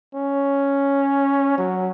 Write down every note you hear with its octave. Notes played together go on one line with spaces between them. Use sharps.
C#4
F#3